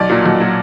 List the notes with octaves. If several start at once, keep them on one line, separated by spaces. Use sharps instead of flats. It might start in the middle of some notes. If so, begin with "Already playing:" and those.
Already playing: B1 D5
A#2 F#3
B1
A#2 F#3